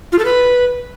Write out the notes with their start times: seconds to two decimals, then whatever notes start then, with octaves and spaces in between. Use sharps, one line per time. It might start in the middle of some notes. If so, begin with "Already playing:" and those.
0.12 F4
0.19 A4
0.25 B4